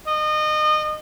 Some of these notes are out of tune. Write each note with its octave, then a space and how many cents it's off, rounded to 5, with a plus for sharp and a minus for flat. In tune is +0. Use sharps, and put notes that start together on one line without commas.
D#5 -30